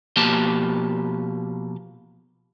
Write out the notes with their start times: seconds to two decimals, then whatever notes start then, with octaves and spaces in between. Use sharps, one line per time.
0.16 B2 F3 A#3 G4 A5